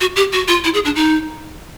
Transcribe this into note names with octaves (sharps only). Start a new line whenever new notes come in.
F#4
G4
F#4
F4
E4
G#4
D4
D#4